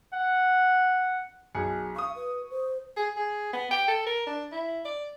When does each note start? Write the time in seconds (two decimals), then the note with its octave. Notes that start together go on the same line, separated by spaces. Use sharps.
0.13 F#5
1.55 B1 G#4 C#7
1.96 F5 C#6 D#6
2.16 B4
2.51 C5
2.97 G#4
3.16 G#4
3.53 B3
3.71 G5
3.88 A4
4.06 A#4
4.27 D4
4.52 E4
4.85 D5